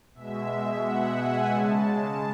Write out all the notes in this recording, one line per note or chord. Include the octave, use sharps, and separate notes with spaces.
B2 G#3 E5
F#5
G#5
C#3 G#3 A5